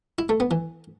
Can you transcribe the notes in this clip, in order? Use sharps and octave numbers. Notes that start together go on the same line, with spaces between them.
E4
A3
B3
E3